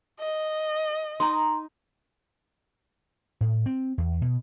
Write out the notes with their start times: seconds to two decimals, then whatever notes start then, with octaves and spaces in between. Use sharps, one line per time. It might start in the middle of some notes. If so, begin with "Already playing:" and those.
0.20 D#5
1.20 D#4 A#5 C6
3.41 A2
3.66 C4
3.98 E2
4.22 B2